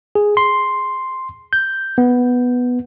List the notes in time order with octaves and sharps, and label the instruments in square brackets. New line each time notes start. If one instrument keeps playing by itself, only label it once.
[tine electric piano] G#4
C6
G6
B3